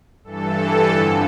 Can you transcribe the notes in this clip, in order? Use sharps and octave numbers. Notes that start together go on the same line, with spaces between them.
G2 E3 A4
F2 D3 F3